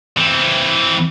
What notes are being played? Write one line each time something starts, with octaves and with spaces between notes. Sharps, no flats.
E3 C4